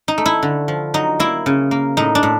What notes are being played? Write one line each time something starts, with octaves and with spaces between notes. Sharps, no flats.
D#4
A3
E4
D3
F3
F#3 D#4
A#3 E4
C#3
A#3
A2 D#4
D4
A2